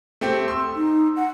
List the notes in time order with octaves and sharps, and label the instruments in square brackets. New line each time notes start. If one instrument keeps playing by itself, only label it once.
[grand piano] A3 C4 G4
C6 E6
[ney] D#4
F#5